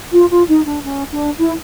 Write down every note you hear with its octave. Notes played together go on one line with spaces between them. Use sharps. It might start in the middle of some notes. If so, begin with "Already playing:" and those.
F4
F4
D#4
D4
C#4
D4
E4